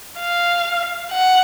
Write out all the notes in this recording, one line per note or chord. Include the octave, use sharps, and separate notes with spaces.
F5
F#5